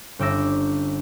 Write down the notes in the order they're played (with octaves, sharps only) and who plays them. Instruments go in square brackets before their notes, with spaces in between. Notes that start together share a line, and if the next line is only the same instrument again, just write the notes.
[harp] G1 C#4 G5 D6 E6 A#6